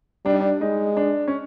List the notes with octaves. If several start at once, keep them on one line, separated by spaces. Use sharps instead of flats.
G3 D4
D#4
D4
G#3 D#4
D4
C#4